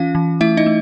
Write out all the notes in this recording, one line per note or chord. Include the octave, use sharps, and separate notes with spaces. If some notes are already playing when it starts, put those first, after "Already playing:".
Already playing: E3 C#4 F4 F5
E3
A3 E4 E5
D#4 D#5
A3